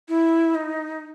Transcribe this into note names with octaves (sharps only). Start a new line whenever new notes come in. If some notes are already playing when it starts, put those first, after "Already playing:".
E4
D#4